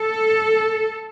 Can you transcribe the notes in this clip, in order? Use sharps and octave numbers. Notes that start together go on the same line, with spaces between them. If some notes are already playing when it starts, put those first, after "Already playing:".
Already playing: A4